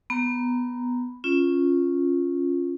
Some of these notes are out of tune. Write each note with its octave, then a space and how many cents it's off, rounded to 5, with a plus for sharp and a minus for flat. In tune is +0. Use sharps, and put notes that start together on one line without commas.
B3 +0 A#5 +0
C#4 -5 F4 +0